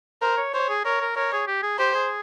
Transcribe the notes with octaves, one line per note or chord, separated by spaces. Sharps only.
A#4 C5
C#5
C5 C#5
G#4
A#4 C#5
A#4
A#4 C#5
G#4
G4
G#4
G4 C5
G#4